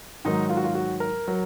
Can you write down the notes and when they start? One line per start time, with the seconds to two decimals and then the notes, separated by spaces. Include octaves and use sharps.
0.25 G#2 D#3 F#3 D#4
0.49 F4
0.57 F#4
0.64 F4
0.75 F#4
1.00 A#4
1.28 F#3